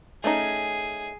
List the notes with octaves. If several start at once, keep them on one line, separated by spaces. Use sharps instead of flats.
A3 C#4 D#4 G#4